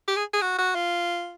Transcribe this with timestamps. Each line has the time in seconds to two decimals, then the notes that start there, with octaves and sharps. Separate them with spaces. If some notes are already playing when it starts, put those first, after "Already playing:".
0.08 G4
0.16 G#4
0.33 G#4
0.42 F#4
0.59 F#4
0.75 F4